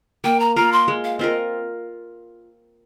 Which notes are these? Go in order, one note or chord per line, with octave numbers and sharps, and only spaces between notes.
A#3 G5
A#5
F4 A#4 A#5
C6
G#3
F5
C4 F4 A#4 D#5